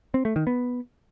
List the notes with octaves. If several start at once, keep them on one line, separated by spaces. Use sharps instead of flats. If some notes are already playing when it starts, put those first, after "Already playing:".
C4
A3
D#3
B3